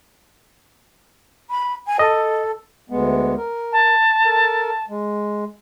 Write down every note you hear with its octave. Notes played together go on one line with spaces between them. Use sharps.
B5
G#5
A4 D#5
D2 G#3 B3
A#4
A5
A4 A#4
G#3